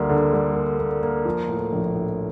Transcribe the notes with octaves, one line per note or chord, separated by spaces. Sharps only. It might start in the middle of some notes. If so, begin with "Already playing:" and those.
Already playing: D2 G3 A#3
D3
G3
A#3
A#3
A#3
F3
A2
A#1
A2